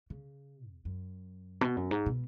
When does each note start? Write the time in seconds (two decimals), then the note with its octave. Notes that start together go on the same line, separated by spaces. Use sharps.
0.10 C#3
0.70 E2
0.85 F#2
1.61 B2
1.77 F#2
1.91 G#2
2.06 B2